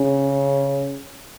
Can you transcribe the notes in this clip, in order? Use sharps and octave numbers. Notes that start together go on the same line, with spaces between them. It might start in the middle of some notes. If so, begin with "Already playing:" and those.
Already playing: C#3